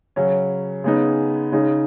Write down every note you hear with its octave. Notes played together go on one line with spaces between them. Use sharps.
C#3 F#3 C#4
C#3 G#3 B3 D#4
C#3 G#3 D#4